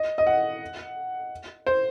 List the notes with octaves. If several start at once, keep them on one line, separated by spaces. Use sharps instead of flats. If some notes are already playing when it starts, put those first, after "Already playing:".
Already playing: D#5
D#5
F#5
C5